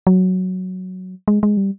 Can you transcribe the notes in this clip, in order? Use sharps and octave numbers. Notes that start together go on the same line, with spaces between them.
F#3
G#3
G#3
G3